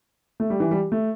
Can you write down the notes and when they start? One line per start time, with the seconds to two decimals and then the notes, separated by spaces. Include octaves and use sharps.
0.40 A3
0.50 G3
0.60 E3
0.71 G3
0.92 A3